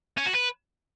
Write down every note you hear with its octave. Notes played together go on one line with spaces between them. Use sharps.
C#4
F#4
B4